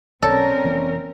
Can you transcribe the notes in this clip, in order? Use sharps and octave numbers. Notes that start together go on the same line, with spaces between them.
B1 C4 C#4 A4 A#4 C#5 D5
F1 E3 A#3